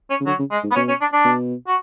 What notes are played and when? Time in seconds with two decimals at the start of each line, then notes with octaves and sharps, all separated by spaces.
0.10 C#4
0.20 C#3
0.26 D3 F#3
0.39 C#3
0.51 G#3
0.64 G#2
0.71 B3
0.75 B2 C#4
0.88 C#4
1.01 D4
1.13 D4
1.25 B2
1.67 F#4